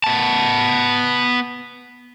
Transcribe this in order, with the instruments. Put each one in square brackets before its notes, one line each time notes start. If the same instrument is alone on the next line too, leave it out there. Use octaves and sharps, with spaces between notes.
[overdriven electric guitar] B3 A5